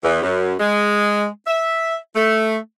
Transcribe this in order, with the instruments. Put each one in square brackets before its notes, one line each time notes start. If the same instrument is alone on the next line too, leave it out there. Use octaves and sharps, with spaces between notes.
[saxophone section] E2
F#2
G#3
E5
A3